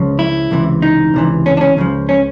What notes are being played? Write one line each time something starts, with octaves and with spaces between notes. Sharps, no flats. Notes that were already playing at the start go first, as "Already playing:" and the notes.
Already playing: C#2 C#3 F3
E4
C#2 C3 E3
D#4
C#2 C3 E3
C#4
D4
C#4
C#2 C#3 F3
C#4